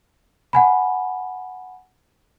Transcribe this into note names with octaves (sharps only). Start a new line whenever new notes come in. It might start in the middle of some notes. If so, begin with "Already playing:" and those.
F#5 G#5 B5